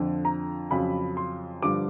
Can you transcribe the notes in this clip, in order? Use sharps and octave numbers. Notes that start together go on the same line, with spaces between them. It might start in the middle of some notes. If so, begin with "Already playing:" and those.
Already playing: F2 D3 F3
A#5
F2 C#3 F#3 B5
C6
G2 D3 F3 D6